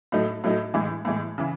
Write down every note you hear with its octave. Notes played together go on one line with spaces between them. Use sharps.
A2 F#3 A3 D#4
A2 F#3 A3 D#4
A2 E3 G#3
A2 E3 G#3
C#3 E3